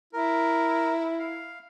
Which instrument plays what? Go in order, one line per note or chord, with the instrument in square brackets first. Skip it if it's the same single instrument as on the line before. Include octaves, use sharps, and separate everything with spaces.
[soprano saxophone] E4 [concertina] A#4
[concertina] F5